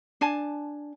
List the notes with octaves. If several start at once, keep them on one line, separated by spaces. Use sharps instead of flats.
D4 G#5 A5